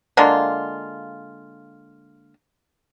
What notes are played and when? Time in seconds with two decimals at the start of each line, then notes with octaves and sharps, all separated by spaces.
0.17 D3 G#3 A#3 F4